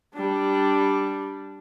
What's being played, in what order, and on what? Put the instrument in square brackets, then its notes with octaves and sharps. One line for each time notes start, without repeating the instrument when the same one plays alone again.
[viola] G3 D4